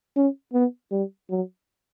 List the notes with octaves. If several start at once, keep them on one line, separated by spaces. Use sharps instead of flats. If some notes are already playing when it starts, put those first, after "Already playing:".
C#4
B3
G3
F#3